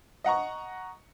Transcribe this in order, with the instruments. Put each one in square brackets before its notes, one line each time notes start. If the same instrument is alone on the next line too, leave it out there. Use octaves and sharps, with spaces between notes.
[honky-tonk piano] D#5 F#5 A#5 C#6